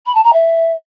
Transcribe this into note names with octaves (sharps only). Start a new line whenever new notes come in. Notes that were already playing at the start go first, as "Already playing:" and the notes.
B5
A5
A#5
E5